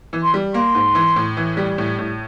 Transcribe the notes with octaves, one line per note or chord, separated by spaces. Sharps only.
E3
C6
G3
A#3 C6
G#2
E3
A2
E3
G3
A2
A2